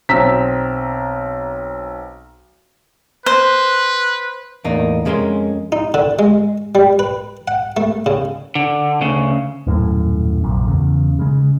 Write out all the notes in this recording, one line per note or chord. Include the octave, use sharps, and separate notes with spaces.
B1 C4 A#5 E6 B6
B4 C5
E2 A2 A#3 D#4
F2 D#3 G#3 C#4 A#4 C6
D#4
D3
G#3
G3
B4
F#5
A3
C#3
D3
D2 C#3
D#1 F#2 A2
F1 A#1 F#2
E2 C#3
C#3 G#3